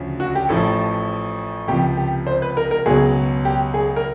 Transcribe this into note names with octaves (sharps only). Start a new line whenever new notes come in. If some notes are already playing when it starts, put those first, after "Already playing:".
Already playing: D2 C#3 F3
F#4
G4
A1 A2 F3 A4
C#2 C3 F3 G4
G4
C5
B4
A#4
A#4
C#2 B2 F#3 G#4
G4
G#4
A#4